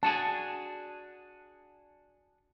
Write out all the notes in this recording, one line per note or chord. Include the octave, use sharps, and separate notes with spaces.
D4 F#4 G#4 A5